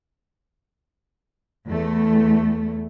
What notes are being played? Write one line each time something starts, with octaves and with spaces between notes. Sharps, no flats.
E2 A3